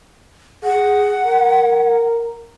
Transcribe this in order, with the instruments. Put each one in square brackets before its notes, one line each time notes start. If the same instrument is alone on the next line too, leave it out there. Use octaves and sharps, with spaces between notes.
[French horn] G#4 [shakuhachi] F#5
[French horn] A#4